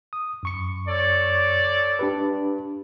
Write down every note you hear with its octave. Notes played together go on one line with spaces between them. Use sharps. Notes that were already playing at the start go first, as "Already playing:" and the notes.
D#6
F#2 C#6 C#7
A4 C#5 D5
D4 G4 B4